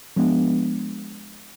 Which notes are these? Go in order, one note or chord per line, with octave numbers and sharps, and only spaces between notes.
F3 G#3 B3 D4